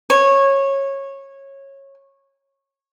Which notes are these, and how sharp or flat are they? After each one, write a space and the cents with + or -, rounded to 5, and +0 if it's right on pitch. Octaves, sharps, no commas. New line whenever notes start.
C#5 -15